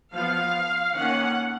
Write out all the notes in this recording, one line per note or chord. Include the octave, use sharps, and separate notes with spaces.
F3 B3 F5
D#3 A#3 C#4 F#5